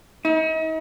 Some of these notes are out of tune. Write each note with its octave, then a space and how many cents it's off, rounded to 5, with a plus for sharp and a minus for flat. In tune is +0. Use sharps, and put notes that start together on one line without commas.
D#4 +40